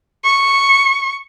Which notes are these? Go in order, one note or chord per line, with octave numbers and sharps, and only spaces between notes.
C#6